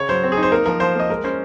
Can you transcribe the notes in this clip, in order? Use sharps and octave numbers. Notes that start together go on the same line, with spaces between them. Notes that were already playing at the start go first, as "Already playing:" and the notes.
Already playing: C#3 C#5
F#3 C5
C4
G#4
D#4
C5
A#3 A#4
F3 A#4
F3 C5
A#3 D#5
G#3 A#4
C#4 C5